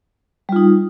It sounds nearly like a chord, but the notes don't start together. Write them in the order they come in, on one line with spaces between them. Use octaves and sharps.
G3 F4 D#4